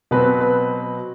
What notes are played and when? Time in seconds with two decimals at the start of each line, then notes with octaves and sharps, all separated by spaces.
0.11 B2 F#3 C4 B4
0.41 B4